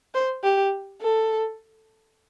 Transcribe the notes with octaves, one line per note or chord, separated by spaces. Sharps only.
C5
G4
A4